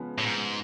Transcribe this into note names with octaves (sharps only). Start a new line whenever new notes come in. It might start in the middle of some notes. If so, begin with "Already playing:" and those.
Already playing: C#3 F3 G#3 B3
A2
G#2